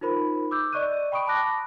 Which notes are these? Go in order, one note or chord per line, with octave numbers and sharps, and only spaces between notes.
D#4 F4 A#4 C5 B5
D6 E6 G6
D5 D#5 C#6 F#6 D#7
G5 B5 C#6 D#6 D7
A5 B5 D6 F#6 A#6